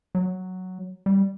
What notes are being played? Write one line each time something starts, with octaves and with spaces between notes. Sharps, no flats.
F#3
G3